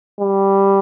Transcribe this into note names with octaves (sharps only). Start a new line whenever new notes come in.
G3